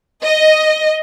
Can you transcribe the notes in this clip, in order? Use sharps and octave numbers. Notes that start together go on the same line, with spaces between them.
D#5